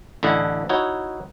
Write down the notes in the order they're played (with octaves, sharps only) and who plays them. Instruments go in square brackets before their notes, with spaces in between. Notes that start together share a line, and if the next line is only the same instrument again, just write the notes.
[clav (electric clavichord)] A1 D3 E4 D#5 F#5
D#4 E4 F#4 C#5